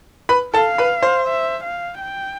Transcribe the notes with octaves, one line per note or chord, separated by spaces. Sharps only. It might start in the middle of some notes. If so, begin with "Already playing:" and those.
B4 B5
A4 F5 A5
B4 B5
C5 C6
E5
F5
G5